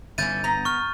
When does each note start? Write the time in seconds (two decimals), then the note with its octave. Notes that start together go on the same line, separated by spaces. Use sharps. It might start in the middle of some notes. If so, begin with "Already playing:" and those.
0.18 G1 E3 C#4 E4 G6 A6 D#7
0.44 B3 A#5
0.65 C#6 F6